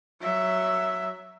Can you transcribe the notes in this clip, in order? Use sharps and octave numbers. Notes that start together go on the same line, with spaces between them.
F#3 E5